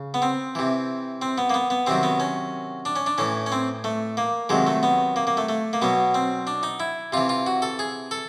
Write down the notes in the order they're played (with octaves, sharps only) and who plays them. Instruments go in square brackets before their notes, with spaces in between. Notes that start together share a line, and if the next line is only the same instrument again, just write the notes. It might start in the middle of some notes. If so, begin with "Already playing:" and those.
Already playing: [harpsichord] C#3
B3
C4
C3 E3
C4
B3
A#3
B3
B3
C3 D#3 F#3 C4
B3
C#4
D4
C#4
D4
A2 E3 C#4
C#4
C4
A3
A#3
C3 D#3 F#3 G#3
A3
B3
A#3
A#3
A3
A3
A#3
B2 F#3 B3
C4
D4
D#4
E4
C3 E3 F4
F4
F#4
A4
G#4
A4